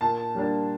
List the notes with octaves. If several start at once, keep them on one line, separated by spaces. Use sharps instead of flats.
A#2 A5
G3 A#3 D4